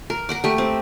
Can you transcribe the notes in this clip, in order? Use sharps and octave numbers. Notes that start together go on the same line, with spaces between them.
A#4
A#4 F#5 D6
A3 G4
C4